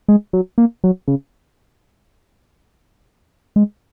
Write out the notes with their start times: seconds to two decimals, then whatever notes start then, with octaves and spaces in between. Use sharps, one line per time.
0.08 G#3
0.33 F#3
0.58 A#3
0.84 F#3
1.08 C#3
3.56 G#3